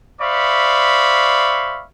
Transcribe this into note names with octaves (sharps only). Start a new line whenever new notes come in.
C5 D5 E5 F5 B5 C#6